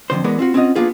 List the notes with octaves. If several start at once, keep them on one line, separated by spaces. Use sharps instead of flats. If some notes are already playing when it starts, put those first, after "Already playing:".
F2 A#2 D3 C5
E3 G#3 B3 A#4 D5
C4 F4 F#4
C4 C#4 F4 D5 D#5 F#5
A#3 B3 D4 F4 G#4